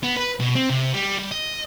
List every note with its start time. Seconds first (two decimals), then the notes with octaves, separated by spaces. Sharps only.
0.03 B3
0.17 B4
0.40 B2
0.55 C4
0.69 C3
0.93 G3
1.19 G3
1.31 D#5